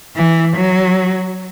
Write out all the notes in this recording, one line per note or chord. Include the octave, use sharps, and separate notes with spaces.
E3
F#3